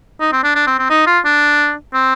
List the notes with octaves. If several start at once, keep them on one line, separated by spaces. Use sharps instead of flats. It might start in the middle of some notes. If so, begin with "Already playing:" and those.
D#4
C4
D4
D4
C4
C4
D#4
F4
D4
C4